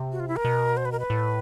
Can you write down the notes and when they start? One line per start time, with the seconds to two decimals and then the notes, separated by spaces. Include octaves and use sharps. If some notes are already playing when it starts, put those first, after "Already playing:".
Already playing: C3
0.12 F#4
0.20 F4
0.28 E4
0.36 A#4
0.45 B2
0.77 C5
0.85 B4
0.92 A#4
0.99 B4
1.10 A2